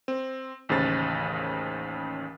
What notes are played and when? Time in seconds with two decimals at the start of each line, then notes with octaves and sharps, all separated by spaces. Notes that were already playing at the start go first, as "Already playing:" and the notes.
0.08 C4
0.69 A1 D#2 C#3 C5 A6